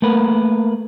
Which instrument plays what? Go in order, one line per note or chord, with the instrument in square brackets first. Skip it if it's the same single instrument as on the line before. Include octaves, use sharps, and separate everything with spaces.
[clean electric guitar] A3 A#3 A#4 B4